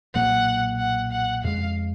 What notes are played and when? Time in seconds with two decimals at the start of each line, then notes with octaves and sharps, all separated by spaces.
0.14 B1 A#2 F#3 A#3 F#5
0.79 F#5
1.11 F#5
1.43 F2 C#3 G#3 F5